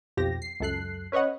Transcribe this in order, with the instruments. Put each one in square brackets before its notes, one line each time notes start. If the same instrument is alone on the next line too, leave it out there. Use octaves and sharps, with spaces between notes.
[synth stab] B1 F2 F3 G4 A#6
C7
C#2 F#2 A4 F#6 C7
C#4 B4 C#5 D#5 F#5